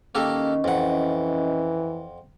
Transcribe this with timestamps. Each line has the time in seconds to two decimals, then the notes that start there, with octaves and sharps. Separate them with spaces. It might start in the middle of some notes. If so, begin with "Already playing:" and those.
0.15 D#3 A#3 C#4 G4 A4 D#5
0.64 F2 E3 F#5